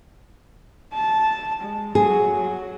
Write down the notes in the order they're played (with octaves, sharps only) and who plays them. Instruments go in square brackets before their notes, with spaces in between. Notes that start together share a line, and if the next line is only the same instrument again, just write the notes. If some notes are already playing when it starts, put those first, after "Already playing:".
[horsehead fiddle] A5
G#3
[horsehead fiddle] F#3 F#4 [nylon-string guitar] G#4
[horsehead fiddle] F#3 F#4